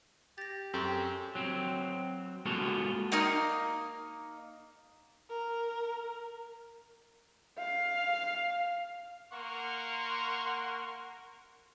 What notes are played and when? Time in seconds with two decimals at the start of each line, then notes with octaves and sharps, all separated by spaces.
0.38 G4 A6 A#6
0.74 F#2 C4 G4 A4 C#6 F#7
1.35 F#3 C4
2.46 G#3 A#3 B3 F4 F#4 A4
3.12 A#3 D#4 D#5 F6
5.29 A#4
7.59 F5
9.32 A#3 A#4 F#5 C6 C#6